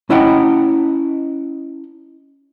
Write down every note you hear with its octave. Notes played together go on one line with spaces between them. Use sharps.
C#4 E4 D#5 F#5 G5